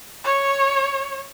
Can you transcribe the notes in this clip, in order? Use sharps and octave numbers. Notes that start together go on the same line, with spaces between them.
C#5